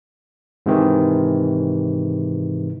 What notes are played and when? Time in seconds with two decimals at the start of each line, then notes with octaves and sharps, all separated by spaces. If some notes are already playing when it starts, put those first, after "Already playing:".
0.66 G#2 C3 D#3 E3